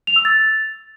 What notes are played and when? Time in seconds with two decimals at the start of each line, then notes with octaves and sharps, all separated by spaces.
0.07 F7
0.16 E6
0.25 A6